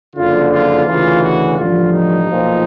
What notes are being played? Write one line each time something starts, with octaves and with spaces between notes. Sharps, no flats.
F#1 F2 D3 F4
F4
D2 C#3 E3 F4
F#4
A1 G2 D3 F3 F4
D#4
B1 A#2 F3